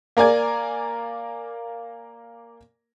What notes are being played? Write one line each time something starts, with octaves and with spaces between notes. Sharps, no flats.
A#3 A#4 D5 G#5 G#6